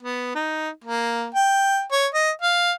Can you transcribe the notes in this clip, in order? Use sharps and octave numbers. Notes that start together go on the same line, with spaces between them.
B3
D#4
A#3
G5
C#5
D#5
F5